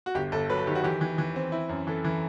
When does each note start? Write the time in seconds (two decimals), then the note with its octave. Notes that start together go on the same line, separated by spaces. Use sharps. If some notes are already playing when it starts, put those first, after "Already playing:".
0.06 F#4
0.15 G1 G4
0.32 G1 A4
0.50 F#3 B4
0.58 A4
0.67 D#3 G4
0.75 F#4
0.84 E3 G4
1.01 E3
1.18 E3
1.36 C4
1.52 E4
1.69 F#2
1.87 E3 A4
2.04 E3